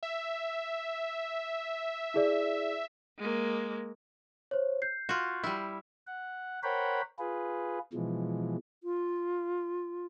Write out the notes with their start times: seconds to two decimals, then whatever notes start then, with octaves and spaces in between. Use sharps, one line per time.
0.03 E5
2.14 E4 G#4 D5
3.18 G#3 A#3
4.51 C5 C#5
4.82 G6 C7
5.09 F4 F#4
5.43 G3 E4
6.07 F#5
6.63 A#4 C5 C#5 F#5 G5 B5
7.19 F4 G#4 B4
7.93 B2 E3 F3 G#3
8.84 F4